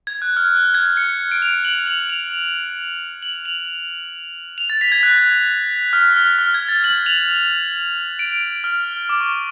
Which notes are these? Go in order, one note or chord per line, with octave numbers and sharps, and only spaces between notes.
G#6
F#6
F6
F#6
G#6
C#7
D7
F7
F#7
F7
F7
F#7
F7
F7
A6
B6
G#6
F#6
F6
F6
F6
G#6
A6
F#7
F7
D7
F6
D6
C#6
D6